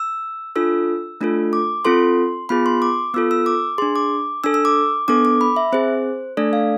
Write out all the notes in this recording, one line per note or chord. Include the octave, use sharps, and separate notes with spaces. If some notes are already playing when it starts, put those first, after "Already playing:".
Already playing: E6
D4 F4 A4 E6
A3 D4 F4 A4
D6
C4 F4 A4 C6
B3 F4 G#4 B5
C6
D6
B3 F4 A4 E6
E6
D6
D4 G#4 C6
D6
D4 A4 E6
E6
D6
B3 D4 A4 D6
D6
B5
E5
C4 G#4 C5
A3 D4 A4 D5
F5